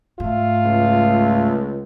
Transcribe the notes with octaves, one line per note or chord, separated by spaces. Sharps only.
G#2 A3 F4
C#2